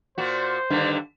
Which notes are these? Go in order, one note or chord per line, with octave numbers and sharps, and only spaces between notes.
A#2 F#4 C5
G2 D3 D#3